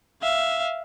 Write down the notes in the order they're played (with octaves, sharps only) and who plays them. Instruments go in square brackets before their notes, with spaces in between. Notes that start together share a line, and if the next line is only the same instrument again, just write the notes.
[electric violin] E5 F5